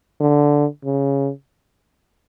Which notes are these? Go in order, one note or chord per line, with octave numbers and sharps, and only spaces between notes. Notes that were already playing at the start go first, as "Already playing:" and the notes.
D3
C#3